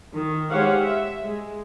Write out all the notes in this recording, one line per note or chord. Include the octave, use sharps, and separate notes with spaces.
D#3
G#3 G4 C5 C#5 F5 F#5
E5
G#3